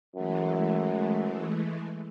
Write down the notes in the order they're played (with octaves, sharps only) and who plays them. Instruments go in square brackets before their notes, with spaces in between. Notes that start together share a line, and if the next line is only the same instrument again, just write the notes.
[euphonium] F#2 [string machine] E3 G#3 A3